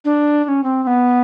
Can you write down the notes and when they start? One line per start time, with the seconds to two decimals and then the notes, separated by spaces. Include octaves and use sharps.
0.05 D4
0.44 D4
0.48 C#4
0.63 C4
0.83 C4
0.87 B3